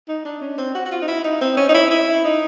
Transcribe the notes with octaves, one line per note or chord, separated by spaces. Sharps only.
D#4
D4
C#4
C4
F#4
F#4
F4
D#4
E4
D#4
C4
C#4
D#4
E4
E4
D#4